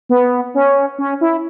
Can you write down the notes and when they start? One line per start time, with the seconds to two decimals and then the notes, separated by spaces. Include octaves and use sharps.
0.09 B3
0.54 C#4
0.99 C#4
1.21 E4